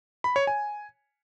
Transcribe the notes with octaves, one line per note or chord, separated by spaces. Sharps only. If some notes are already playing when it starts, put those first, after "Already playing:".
B5
C#5
G#5